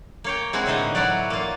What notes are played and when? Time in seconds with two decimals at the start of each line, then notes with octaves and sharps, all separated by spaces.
0.24 A#3 C#5 G5
0.53 G#3 C4 E4 F#4 G#4 G#5
0.66 A2 D3 A#3 D#4 D#5 E5
0.95 F#3 E4 F#4 B4 D5
1.30 A#3 F4